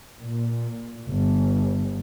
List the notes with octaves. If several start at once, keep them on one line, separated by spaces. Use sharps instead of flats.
A#2
G1